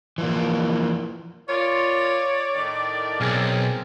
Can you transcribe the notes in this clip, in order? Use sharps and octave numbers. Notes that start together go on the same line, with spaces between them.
E3 F3 A#3
F4 A#4 C#5 D5
A2 D#3
B1 C4 G#4 A#4 F5